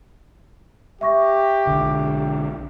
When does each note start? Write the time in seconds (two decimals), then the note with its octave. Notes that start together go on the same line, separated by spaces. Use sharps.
1.01 G4 E5 C#6 A#6
1.67 B1 D3